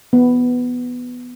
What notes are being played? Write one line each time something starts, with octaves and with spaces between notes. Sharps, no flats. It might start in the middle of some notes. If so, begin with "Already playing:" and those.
B3